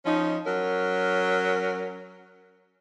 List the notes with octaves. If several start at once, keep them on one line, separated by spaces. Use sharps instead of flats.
F3 C#4 D#4
F#3 C#4 A#4